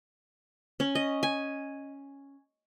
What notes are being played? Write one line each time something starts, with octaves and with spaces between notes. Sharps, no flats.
C#4
D#5
G#5